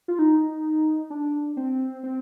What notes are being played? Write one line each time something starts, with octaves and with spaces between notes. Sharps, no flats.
F4
D#4
D4
C4
C4